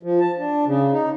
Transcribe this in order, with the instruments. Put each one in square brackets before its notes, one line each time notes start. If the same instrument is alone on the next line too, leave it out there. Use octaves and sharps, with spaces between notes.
[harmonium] F3
A5
D4
C#3
D#4